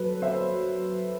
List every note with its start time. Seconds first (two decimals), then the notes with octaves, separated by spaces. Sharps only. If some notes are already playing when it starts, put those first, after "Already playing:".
Already playing: F#3 A4 B4
0.22 C5 E5